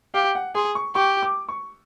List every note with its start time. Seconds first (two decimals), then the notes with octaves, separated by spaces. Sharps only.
0.14 G4 F5
0.35 F#5
0.55 G#4 C6
0.75 C#6
0.95 G4 C#6
1.22 D6
1.49 C#6